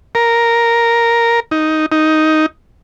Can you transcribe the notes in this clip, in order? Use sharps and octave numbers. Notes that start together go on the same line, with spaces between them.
A#4
D#4
D#4